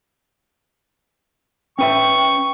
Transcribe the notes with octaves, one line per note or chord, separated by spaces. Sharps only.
C#4 B4 E5 G5 C#6